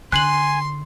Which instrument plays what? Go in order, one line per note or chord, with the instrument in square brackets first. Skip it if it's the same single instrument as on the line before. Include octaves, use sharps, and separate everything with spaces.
[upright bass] D3 [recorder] G#5 [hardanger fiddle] C6 [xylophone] F#6 C7 F#7